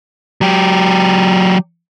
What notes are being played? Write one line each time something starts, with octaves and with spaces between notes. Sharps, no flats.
F#3 G4